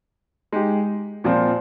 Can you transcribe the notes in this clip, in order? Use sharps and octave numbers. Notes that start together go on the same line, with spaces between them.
G#3 D#4 G4
A#2 F3 C4